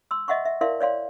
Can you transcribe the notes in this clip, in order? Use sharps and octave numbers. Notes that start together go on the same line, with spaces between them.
C6 E6
D#5 E5 F#5 C6 C#6
E5
E4 A#4 D5 E5 F5 C6
C#5 D5 F5 C6